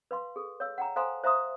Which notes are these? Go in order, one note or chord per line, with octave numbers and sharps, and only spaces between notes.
B4 F5 C6
G#4 A4
C#5 F5 E6
F#5 G5 A#5
A4 C5 F5 G#5 A#5 C6
C5 E5 F5 A#5 C6 D#6